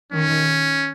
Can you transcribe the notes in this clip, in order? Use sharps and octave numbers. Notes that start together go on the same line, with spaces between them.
D#3 C#4